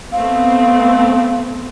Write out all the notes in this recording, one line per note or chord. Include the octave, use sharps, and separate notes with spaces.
A3 B3 C4 F5